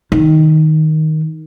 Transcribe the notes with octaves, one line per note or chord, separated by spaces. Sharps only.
D#3